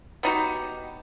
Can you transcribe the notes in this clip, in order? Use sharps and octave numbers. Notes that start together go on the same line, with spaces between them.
B3 D#4 F#4 G4